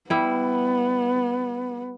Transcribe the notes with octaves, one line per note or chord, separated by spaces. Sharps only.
G3 B3 E4